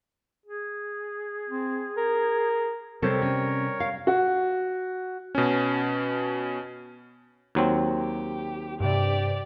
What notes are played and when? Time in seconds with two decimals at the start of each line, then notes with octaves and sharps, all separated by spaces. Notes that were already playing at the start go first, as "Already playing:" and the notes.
0.46 G#4
1.50 C4
1.97 A#4
3.02 C3 G3 C4 A4 A#4 C5 C#5
3.22 C#4
3.80 F5
4.07 F#4
5.35 B2 C#4
7.55 D#2 F#3 C4
7.99 G4
8.80 G2 C3 G4 D5